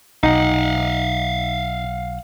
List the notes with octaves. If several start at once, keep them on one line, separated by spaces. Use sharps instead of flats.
B1 D#4 F5 F#5